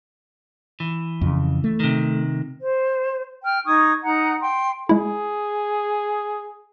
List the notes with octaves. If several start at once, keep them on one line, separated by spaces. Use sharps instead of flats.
E3
F2 C#3
A3
C3 D#3
C5
G5 F6
D#4 C#6 D#6 G#6
D#4 F#5 A#5
G5 C6
G#3 E4 G#4